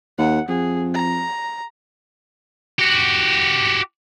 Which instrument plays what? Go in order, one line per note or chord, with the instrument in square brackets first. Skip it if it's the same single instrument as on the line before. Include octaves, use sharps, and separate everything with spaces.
[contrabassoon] D#2 [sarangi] F#5
[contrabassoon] F2 [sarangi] G#4
[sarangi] A#5
[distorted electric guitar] F#4 G4